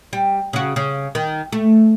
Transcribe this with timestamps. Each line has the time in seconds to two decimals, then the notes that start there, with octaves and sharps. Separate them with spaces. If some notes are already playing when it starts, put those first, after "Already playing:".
0.13 G3
0.53 C#3 F#4
0.76 C#3
1.15 D#3
1.52 A3